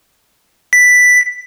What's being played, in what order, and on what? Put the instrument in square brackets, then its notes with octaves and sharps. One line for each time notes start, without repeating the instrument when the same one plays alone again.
[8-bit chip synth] B6